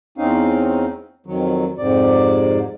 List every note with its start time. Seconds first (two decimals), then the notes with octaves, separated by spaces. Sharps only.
0.18 E2 C4 C#4 D#4 F5
1.26 F2 D#3 F#3
1.78 F2 G#2 C3 D5